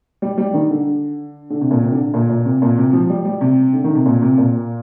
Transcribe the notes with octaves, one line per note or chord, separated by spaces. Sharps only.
G3
G3
D#3
D3
D3
C3
A#2
C3
D3
A#2
A#2
C3
A#2
C3
F3
G3
G3
C3
D3
D#3
C3
A#2
C3
A#2